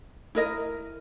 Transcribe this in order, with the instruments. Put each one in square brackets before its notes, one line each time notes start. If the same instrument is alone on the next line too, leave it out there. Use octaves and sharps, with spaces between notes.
[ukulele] E4 A#4 D#5